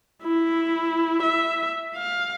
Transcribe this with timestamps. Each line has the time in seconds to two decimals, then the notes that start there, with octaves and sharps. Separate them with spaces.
0.23 E4
1.23 E5
1.96 F5